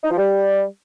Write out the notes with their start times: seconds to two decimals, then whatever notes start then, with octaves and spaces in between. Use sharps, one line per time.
0.03 D#4
0.10 F3
0.17 G3